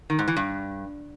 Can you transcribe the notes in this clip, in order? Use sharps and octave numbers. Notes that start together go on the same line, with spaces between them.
D#3
G#2
E3
G2